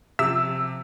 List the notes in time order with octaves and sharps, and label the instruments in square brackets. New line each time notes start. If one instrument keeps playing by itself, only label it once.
[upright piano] C3 F3 [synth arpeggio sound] E5 [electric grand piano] E6